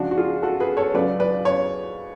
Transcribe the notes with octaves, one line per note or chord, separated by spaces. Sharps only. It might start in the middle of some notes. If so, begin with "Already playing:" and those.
Already playing: C#2 C#3 F3 D4 F#4
F#4
F4 G#4
F#4 A4
G#4 B4
A4 C#5
C#2 C#3 F#3 B4 D5
B4 D5
C#5